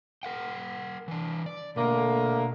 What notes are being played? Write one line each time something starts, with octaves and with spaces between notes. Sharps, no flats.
A#4 F#5 G5
E3 D4
D5
B2 D3 A3 A#3